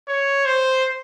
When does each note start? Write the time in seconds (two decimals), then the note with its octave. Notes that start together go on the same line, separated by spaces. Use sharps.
0.08 C#5
0.45 C5